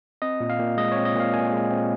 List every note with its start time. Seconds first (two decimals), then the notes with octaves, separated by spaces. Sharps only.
0.22 C4 D#5
0.40 A#2
0.50 F5
0.59 A#2
0.77 G#3 D#5
0.92 C#5
0.97 C4
1.05 D#5
1.15 A#2 F5
1.33 A#2 G#5
1.52 G#3
1.71 C4